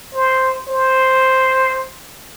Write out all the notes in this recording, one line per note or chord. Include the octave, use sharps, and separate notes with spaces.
C5
C5